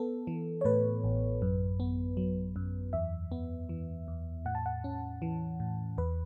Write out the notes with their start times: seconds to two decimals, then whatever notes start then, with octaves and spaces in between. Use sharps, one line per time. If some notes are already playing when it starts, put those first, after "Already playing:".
Already playing: B3 A4
0.27 E3
0.61 C#5
0.65 A2 B4
1.04 A1
1.42 F#2
1.80 B3
2.17 F#3
2.56 F#2
2.93 E2 E5
3.32 B3
3.69 E3
4.08 E2
4.45 A2 F#5
4.55 A5
4.66 F#5
4.84 C#4
5.22 E3
5.60 A2
5.98 E2 B4